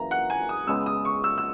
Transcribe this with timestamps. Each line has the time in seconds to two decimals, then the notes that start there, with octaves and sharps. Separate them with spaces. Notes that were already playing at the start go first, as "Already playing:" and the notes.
Already playing: F#2 E3 A#3 A#5
0.11 F#5
0.30 G#5
0.49 D#6
0.67 C#2 C#3 G#3 B3 E6
0.86 D#6
1.05 C#6
1.24 E6
1.38 E6